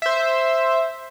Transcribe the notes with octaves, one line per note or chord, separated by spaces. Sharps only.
C5 E5